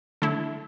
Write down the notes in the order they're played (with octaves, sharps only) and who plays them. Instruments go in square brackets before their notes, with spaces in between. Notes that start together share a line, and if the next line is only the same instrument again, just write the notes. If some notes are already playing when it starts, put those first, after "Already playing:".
[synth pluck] D3 A3 E4 A4